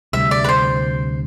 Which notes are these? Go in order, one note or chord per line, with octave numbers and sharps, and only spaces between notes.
D2 C3 G3 E5
D5
B4
C5